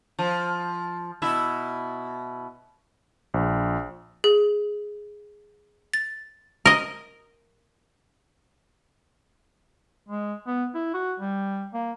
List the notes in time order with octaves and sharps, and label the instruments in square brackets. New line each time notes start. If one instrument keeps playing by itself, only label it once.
[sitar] F3
B2 E4 E5
[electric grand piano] A#1
[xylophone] G#4
A6
[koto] A#4 D#5
[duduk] G#3
B3
E4
F#4
G3
A#3